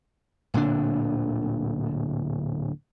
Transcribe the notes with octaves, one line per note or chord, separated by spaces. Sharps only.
D1 A#2 D3 D4